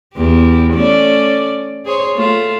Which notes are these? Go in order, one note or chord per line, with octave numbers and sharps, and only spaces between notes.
E2 G4
A3 C#4 D5
G#4 C5 C#5
A3 F4